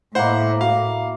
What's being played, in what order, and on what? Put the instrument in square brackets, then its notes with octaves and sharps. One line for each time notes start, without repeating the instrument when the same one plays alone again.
[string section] A2 [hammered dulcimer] A#3 E4 [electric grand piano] C5 F#5
[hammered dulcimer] F#4 [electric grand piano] F5